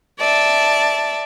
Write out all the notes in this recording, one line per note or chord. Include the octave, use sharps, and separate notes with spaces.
D5 E5 A5